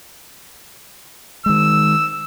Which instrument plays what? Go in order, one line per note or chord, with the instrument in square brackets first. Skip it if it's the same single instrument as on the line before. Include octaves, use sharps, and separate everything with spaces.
[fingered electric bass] D#3 G#3 [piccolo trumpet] E6